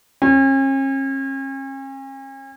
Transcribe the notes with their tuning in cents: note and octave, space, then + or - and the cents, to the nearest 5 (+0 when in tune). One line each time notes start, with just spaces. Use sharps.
C#4 -40